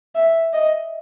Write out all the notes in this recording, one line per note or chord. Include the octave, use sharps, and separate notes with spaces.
E5
D#5